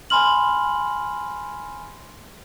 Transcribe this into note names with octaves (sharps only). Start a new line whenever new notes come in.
G#5 B5 C6 F6 F#7